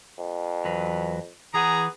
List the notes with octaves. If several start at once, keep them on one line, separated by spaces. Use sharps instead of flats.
F2
E2 F#3 B4
E3 B3 G#4 A#5